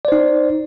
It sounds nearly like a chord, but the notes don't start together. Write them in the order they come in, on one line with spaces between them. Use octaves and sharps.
D5 C5 D#4